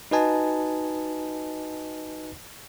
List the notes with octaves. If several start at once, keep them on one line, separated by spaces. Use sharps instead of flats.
D#4 F#4 B4 D#5 G#5 A5